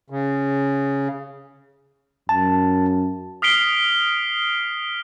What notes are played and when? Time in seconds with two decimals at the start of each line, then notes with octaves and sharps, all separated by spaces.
0.10 C#3
2.29 F#2 A5
3.42 D#6 F6 B6 C7 D7 G7